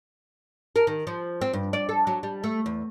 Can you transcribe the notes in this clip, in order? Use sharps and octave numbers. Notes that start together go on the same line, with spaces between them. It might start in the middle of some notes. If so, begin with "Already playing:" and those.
A#4
D#3
F3
C4
G2
D5
A4
F#3
G3
A3
E2